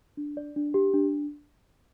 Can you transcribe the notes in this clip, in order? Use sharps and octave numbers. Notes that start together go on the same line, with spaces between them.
D4
D5
D4
G4
D4